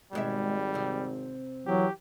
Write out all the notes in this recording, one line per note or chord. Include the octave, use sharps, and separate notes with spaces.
G#1 B2 G3 G#3 E5
C3 C4
E3 F#3 G4